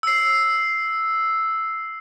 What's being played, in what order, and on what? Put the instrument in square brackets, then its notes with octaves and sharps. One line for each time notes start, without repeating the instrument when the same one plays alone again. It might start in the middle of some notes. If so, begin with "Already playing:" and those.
[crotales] E6 C7